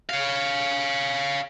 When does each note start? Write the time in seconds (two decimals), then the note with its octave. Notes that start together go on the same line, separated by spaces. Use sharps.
0.09 C#5 F5